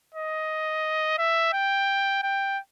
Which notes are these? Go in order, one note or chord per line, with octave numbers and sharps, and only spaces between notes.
D#5
E5
G5
G5